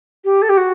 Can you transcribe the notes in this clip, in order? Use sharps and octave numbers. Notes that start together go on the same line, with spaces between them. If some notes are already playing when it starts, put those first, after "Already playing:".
G4
A4
G4
F#4